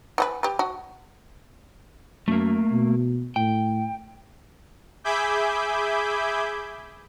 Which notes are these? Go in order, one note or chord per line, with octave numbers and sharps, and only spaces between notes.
E3 F#4 B4
G4 B4
F#4
F#2 A3 A#3
B2
A2 G5
G#4 E5 G#5 B5 D6 G6